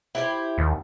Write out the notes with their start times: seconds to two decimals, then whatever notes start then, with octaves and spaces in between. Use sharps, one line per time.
0.15 E4 G4 C5
0.58 D#2